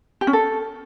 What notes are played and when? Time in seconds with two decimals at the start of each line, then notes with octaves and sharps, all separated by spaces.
0.21 G4
0.27 C#4
0.33 A4